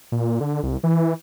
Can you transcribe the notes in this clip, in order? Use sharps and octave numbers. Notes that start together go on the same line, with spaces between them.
A#2
D3
C2
E3